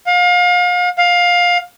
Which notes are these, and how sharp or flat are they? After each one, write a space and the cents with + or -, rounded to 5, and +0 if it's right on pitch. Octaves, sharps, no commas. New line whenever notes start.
F5 +35
F5 +20